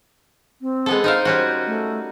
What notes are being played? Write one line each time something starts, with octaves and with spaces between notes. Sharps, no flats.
C4
G#3 B3 A4
D#4 A#4 C5 F5
G3 C#4 F#4
A3